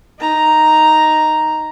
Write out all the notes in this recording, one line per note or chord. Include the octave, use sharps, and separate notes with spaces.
D#4 A#5